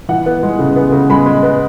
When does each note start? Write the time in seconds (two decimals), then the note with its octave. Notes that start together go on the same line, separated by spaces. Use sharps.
0.09 E3 F#5
0.26 B3
0.43 G#3
0.59 C#3
0.76 B3
0.92 C#3
1.10 G#3 B5
1.26 G#3
1.43 B3